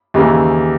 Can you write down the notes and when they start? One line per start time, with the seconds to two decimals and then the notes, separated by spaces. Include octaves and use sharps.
0.14 D#2 C#3 E3